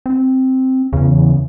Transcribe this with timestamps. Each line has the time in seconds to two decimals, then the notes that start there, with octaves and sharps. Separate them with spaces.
0.06 C4
0.93 E2 C#3